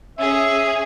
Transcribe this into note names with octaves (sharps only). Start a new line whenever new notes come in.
C#4 G#4 E5